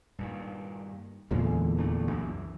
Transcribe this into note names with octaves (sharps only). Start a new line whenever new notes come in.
G2 A#2 D#3
D1 E2 A#2 D3 E3 G#3
D#1 A3 D4
C2 F#2 E3